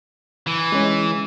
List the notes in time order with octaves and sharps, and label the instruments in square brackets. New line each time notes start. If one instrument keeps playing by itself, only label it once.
[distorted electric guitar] E3
[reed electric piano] G#3 C#4